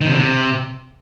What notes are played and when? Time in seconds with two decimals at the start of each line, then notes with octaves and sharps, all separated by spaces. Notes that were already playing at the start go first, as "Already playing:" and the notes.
0.01 D#3
0.07 C3
0.12 D3
0.18 C3